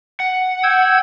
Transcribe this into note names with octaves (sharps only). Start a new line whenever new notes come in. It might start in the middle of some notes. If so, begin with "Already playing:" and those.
F#5
G5 E6 G#6